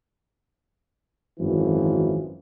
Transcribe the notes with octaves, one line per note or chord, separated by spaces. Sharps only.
G#1 F#2 E3 F3